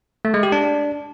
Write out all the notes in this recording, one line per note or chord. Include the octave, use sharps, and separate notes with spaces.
A3
G#3
G4
D4